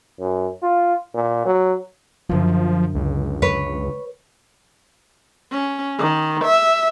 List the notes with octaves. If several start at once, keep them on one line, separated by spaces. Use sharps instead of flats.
F#2
F4
A#2
F#3
F#2 D3 F3
C#2
B4 C#5
C#4
D#3
E5